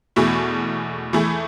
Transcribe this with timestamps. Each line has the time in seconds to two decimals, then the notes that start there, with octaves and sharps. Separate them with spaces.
0.16 E2 B2 A3 E4 G#4
1.13 E3 A3 E4 G#4